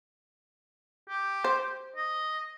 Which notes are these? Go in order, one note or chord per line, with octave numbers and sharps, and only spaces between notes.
G4
C5
D#5